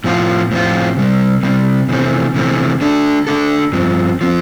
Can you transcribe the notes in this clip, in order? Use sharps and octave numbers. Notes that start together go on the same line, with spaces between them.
A2 F3 C4 F4
A2 F3 C4 F4
C3 G3 C4
C3 G3 C4
C3 E3 A3 C4
C3 E3 A3 C4
D3 A3 D4 A4
D3 A3 D4 A4
G2 F3 C4
F3 C4